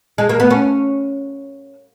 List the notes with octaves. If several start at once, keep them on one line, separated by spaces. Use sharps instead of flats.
G#3
A#3
B3
C#4